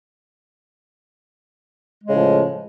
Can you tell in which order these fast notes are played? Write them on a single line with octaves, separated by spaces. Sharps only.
G#3 C#3 A2 F3